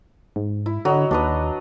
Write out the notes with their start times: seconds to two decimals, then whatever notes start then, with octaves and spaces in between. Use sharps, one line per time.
0.36 G#2
0.66 E4
0.85 D3 F#3 D#5
1.11 D#2 D4 B4 D#5